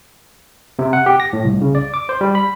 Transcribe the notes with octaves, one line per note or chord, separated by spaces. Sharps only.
C3
F#5
G4
A#6
A2
C2
C#3
D5
D6
C5
G3
B5